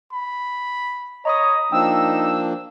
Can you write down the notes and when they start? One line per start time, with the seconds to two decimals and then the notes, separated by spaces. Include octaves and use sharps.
0.13 B5
1.25 C#5 D#5 A#5 B5 D#6
1.72 F3 A#3 D4 D#4 G5 E6